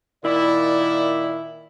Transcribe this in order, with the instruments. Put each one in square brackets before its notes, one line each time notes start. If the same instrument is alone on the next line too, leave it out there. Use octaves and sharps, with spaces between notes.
[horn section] A#2 D#3 E4 [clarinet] D5